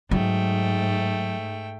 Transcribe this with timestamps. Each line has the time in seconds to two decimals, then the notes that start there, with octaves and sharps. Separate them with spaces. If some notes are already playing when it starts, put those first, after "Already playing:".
0.11 G#2 F#3 A3 G5